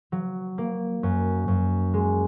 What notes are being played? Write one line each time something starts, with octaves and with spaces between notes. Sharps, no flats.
F#3
A#3
F#2
F#2
G#3